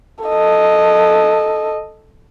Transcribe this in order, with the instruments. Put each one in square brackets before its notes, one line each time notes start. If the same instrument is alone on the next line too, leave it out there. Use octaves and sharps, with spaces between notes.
[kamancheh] A4 D#5